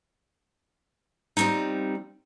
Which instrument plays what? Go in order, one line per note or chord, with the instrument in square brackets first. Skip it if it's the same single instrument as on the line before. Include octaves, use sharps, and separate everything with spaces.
[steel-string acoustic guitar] F3 G3 A#3 C4 D#4